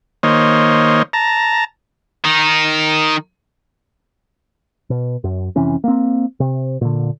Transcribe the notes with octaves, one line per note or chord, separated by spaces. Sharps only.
D#3 A#3 C5 C#5 D#5
A5 A#5
D#3 D#4
B2
F#2
F1 C3 E3 C#4
A#3 C4
C3
A#2 D3